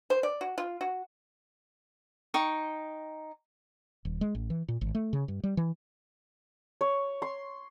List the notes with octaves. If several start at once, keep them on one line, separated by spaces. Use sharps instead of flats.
C5
D5
F#4
F4
F#4
D#4 G5 C#6
D#1
G#3
A1
E3
A#2
G#1
A3
C#3
G2
G3
E3
C#5
C6